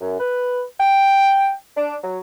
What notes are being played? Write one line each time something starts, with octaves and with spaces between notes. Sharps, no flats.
F#2
B4
G5
D4
F#3